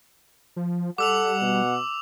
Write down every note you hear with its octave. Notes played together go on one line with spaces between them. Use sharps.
F3
G3 A4 F#5 D6 E6 F7
B2